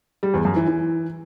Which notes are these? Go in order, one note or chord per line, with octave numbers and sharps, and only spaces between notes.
G3
E2
F#2
E3
E3